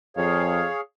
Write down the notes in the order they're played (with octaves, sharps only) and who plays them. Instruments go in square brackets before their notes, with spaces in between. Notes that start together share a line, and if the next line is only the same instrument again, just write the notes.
[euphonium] F2 [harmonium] G#4 C#5 F5